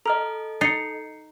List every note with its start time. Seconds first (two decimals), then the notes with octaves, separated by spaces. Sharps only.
0.06 A4 D#5 A#5 F6
0.61 D#4 A6 C7 C#7